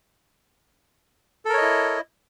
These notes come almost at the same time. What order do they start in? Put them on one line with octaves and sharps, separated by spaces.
A4 A#4 C#5 D#5 E4